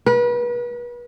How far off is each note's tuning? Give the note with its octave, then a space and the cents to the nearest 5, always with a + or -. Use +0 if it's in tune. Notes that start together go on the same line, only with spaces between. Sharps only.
B4 -35